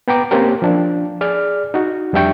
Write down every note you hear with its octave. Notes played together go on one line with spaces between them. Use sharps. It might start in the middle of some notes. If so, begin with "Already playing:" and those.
B3 G5 A#5 D6
A#3 C4 C#4 G4 A#4
F3 D4
G#4 D5 F6
D#4 F#4
F2 G3 D4 E5 G5 C#6